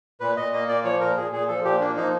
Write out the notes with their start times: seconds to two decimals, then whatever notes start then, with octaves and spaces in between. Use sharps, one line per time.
0.20 A#2 B4
0.37 A#2 D#5
0.53 A#3 D#5
0.68 A#2 D5
0.84 F3 C#5
1.00 A#2 A#4
1.17 A#2 G#4
1.32 A#2 G#4
1.48 F3 A4
1.64 A#2 G4
1.80 A#3 D4
1.96 F3 D#4